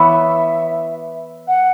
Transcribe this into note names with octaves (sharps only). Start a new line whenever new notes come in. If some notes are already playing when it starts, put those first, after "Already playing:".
Already playing: E3 B3 E4 C#5 E5
F#5